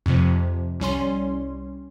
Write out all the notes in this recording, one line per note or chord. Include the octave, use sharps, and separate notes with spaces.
F2 C3 F3
C2 G3 C#4 C6